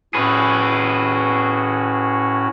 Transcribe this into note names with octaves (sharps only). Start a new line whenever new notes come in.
A2 C#4 F#4 G#4 B4